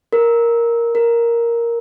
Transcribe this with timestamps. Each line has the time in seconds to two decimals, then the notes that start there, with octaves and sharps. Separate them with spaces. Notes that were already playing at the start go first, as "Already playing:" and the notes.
0.13 A#4
0.95 A#4